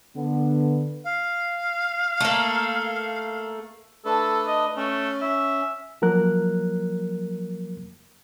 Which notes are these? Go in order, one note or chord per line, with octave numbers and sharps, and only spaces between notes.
D3 B3
F5
A3 A#3
A3 D4 A4 B4
D#5
A3 C#4
E5
F3 F#3 A#3 A#4 F#6